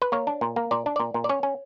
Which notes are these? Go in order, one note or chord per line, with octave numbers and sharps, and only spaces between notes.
B4
A#3 C#5
D4
A#2
A#3
A#2 D5
D4
A#2 D5
A#2
D5
C#4 C#5
C#4